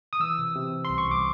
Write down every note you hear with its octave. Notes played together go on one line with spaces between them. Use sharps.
D#6
E3 E6
C3
C3
C3
C6
C2
C#6
C2 D6